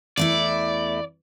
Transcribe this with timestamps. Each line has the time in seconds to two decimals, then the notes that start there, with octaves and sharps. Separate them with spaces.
0.17 E2 A3 E4 D5